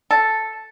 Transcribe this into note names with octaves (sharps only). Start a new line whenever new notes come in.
A4